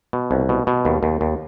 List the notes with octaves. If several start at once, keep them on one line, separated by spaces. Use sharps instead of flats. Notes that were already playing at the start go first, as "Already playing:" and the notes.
B2
C2
B2
B2
D#2
D#2
D#2